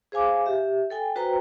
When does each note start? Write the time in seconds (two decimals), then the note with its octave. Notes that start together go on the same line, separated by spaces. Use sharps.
0.12 G#4 C5 F5 G#5 D6
0.46 G4 E5
0.90 A4 G5 G#5
1.16 F#4 B4 C5 G5 A#5